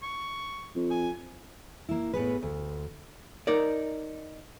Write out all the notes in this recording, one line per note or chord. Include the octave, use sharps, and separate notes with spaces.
C#6
F2
G#5
A#3 E4
A2 B3 G#4 B4
D2
D#4 A#4 D5